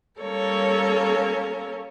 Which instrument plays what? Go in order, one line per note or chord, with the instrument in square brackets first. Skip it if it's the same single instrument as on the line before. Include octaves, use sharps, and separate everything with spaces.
[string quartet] G3 A#3 C#4 A4 A#4 C#5